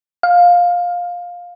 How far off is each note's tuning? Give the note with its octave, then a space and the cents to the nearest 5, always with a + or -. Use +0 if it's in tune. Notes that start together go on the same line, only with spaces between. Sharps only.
F5 +15